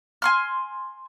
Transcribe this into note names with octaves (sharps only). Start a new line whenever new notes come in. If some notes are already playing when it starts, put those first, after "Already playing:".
G#5 C6 F6